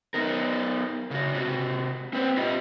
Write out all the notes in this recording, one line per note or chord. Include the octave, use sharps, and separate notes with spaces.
B3 D#4 A#4
C#3 F#4
C3 F#4
C4 B4 C5
F4 G4 D#5